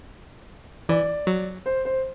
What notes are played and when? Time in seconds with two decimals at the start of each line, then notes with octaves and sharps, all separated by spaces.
0.89 E3 D5
1.27 F#3
1.66 C5
1.85 C5